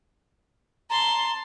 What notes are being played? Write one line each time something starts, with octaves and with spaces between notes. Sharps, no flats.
A5 A#5 C6